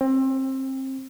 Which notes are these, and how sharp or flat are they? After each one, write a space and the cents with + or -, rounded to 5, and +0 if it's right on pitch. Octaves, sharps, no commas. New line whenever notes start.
C4 +25